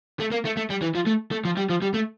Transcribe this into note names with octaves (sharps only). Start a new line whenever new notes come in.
A3
A#3
A3
A3
G3
E3
F3
A3
A3
F3
G3
F3
G3
A3